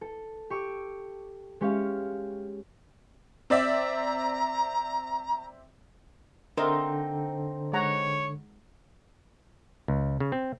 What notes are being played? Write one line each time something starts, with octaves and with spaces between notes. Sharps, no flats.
A4
G4 C#6 D6 E6
G#3 C#4 G4 C#5 F5
C4 D5 E5 A#5
D3 C4 D#4 A#4 D#5 E5
G#3 C#5 F#5 A#5
C#2
C#3
C4